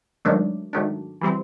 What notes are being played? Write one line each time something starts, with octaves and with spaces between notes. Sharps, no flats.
G#2 D#3 F#3 A3 D4
G#2 D#3 F#3 A3 D4
E3 G3 C4 E4